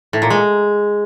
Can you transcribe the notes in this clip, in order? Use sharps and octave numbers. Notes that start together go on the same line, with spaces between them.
A2
A#2
G#3